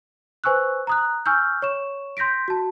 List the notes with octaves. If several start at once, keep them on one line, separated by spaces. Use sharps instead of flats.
B4 C5 G#5 C#6 E6 F#6
A#5 D#6 F#6
G#5 C#6 E6 F6 G6
C#5 C#6 E7
C6 G6 A#6 B6 D7
F#4 A5